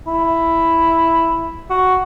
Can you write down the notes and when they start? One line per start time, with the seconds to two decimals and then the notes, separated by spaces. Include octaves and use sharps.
0.07 E4
1.70 F#4